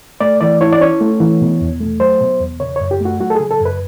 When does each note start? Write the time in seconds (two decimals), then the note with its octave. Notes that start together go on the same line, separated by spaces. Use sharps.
0.20 A3 D5
0.41 E3 D5
0.61 E4 C#5
0.72 D5
0.81 C#4 C#5
1.01 A3
1.20 E3
1.41 B2
1.61 E2
1.80 A3
2.00 F#3 C5
2.21 B2
2.41 E2
2.60 C#3 C#5
2.76 F#2 C#5
2.91 G4
3.00 A3 F#4
3.20 F#3 F#4
3.30 A4
3.35 C#3 G#4
3.51 A4
3.60 F#2
3.65 B4